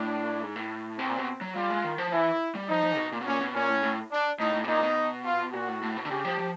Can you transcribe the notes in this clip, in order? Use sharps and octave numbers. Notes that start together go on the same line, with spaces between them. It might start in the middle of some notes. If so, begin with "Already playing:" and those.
Already playing: A2 D4
G#2
A2
B2 C4
A#2
B2
F#3
G3 F4
G#3
D#3
F3
E3 E4
G3
F3 D#4
F3
B2
A#2
B2
A#2 C#4
B2
A#2 C#4
A2
A2
D4
A2 D#4
A2
B2
A#2 D#4
B2
F4
A#2 F#4
A2
A2
B2
D3
C#3 G4
F3
F3